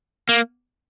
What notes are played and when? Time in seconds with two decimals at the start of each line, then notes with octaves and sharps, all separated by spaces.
0.29 A#3